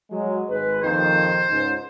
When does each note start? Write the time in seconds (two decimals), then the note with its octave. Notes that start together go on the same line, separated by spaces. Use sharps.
0.11 F#3 G#3
0.49 G#1 G#3 B4
0.83 A#1 F2 D#3 C5
1.50 C#2 G#2